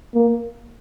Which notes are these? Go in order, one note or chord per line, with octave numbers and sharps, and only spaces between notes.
A#3